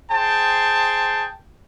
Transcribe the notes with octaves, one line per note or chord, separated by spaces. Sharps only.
G#4 C5 G5 A5